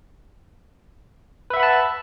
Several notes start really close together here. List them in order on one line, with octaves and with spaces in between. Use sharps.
B4 E5 F#5 B5 A5